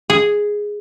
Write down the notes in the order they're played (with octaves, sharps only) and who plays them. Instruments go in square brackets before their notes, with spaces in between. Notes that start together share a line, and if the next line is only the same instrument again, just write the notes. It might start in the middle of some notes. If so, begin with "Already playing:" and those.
[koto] G#4